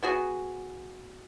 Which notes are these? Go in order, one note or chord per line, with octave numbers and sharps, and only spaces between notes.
B3 F#4 G#4